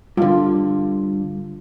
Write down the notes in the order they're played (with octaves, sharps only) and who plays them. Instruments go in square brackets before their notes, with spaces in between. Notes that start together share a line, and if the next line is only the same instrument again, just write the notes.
[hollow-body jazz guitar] G2 D3 [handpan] F4